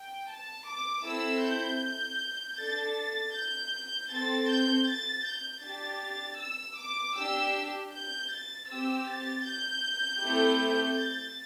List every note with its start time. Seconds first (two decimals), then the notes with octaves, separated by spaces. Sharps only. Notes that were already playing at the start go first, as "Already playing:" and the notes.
Already playing: G5
0.31 A5
0.69 D6
1.06 C4 E4 A4 E6
1.44 G6
2.59 D4 A4 A6
2.97 A6
3.36 G6
4.13 C4 A4 A6
4.50 G6
4.89 A6
5.27 G6
5.64 D4 G4 A6
6.41 E6
6.79 D6
7.18 D4 G4 E6
7.94 G6
8.32 A6
8.70 C4 G4 E6
9.09 A6
9.47 G6
10.23 A3 C4 E4 G4
10.99 A6